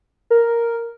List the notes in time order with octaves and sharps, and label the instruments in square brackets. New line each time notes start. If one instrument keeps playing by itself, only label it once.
[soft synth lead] A#4